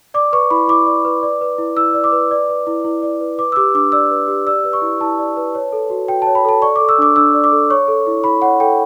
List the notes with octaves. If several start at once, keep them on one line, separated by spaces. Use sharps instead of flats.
D5 D6
B4 C#6
E4 B5
E4 D6
D5
B4
D5
B4
E4
E4 E6
D5
D6
B4
D5
B4
E4
E4
D5
B4
B4 D6
E6
G4 D6
D4 D6
D5 E6
B4
G4
D5 E6
B4
C#6
E4
E4 A5
D5
B4
C#5
A4
F#4
F#4 G5
C#5 A5
B5
A4 A5
D5 C#6
A4 D6
E6
D4 D6
D4 E6
D5
D6
A4
C#5 C#6
A4
E4
E4 B5
C#5 F#5
A4 G5